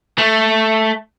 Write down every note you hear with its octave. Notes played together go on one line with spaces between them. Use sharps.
A3